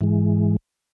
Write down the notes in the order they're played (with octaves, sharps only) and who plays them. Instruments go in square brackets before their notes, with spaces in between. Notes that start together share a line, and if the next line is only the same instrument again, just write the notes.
[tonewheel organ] G#2 E3 G#3